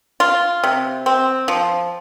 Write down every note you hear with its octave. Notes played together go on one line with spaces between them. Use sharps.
F4
C3
C4
F3